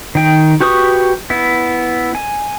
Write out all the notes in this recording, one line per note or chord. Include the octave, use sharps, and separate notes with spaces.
D#3 G5
F#4 G4 B4 C#6 D#6
B3 E4
G#5